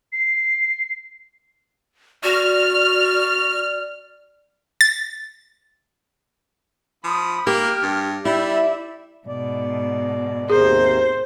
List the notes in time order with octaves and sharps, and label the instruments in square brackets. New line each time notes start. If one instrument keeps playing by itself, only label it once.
[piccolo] C7
[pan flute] F#4 [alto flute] D5 [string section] F6
[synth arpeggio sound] A6
[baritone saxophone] F3 [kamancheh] B5 D#6
[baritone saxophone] A#3 [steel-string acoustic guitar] G4 [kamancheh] F6
[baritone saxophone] G2
[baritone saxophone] G3 [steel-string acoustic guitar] E4 [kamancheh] D5 E5
[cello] G#2 B2 [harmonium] D5
[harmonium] D#2 C3 A#4 [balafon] G#4 [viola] C5